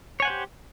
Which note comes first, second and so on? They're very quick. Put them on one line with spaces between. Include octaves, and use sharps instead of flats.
C#5 G#5 F#5 C5 G4